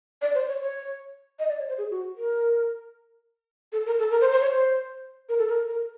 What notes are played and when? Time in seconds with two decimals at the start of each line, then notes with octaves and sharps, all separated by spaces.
0.22 D5
0.35 C5
0.48 C#5
0.61 C#5
1.39 D#5
1.48 D5
1.59 C#5
1.69 C5
1.78 G#4
1.91 F#4
2.17 A#4
3.73 A4
3.86 A#4
3.99 A4
4.11 A#4
4.21 C5
4.32 C5
4.41 C#5
4.50 C5
5.29 A#4
5.39 A4
5.49 A#4
5.68 A#4